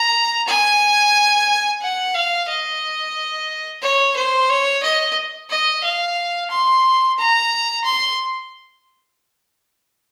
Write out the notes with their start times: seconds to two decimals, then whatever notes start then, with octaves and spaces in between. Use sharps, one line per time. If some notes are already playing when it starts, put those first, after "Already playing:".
Already playing: A#5
0.47 G#5
1.81 F#5
2.14 F5
2.48 D#5
3.82 C#5
4.16 C5
4.49 C#5
4.83 D#5
5.49 D#5
5.83 F5
6.51 C6
7.18 A#5
7.84 C6